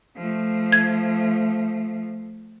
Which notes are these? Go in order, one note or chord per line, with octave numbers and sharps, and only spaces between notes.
F3 A3
G#6